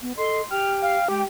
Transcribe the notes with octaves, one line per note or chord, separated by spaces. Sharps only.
B3
A4 D#5 C6
G4 G5 F6
F5
G#3 G4 G5